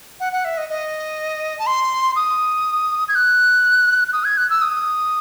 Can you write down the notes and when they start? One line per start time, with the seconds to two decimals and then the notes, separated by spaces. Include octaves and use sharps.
0.20 F#5
0.33 F#5
0.45 E5
0.57 D#5
0.70 D#5
1.59 A5
1.67 C6
2.16 D#6
3.08 G#6
3.15 F#6
4.13 D#6
4.24 G#6
4.37 F#6
4.50 E6
4.62 D#6